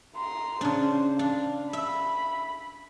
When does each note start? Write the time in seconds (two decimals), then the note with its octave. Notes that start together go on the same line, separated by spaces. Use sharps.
0.16 A#5 C6
0.61 C#3 D4 C5
1.19 D4 F5
1.73 E5 B5